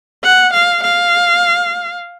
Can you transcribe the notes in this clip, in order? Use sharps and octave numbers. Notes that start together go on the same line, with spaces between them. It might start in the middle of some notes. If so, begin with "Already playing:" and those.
F#5
F5
F5